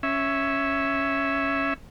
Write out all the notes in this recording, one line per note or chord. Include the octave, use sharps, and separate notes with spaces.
C#4 E5